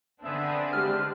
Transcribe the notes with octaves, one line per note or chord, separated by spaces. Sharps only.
D3 B3 C4 D4 G#4 E5
G#3 G4 B4 C5 F6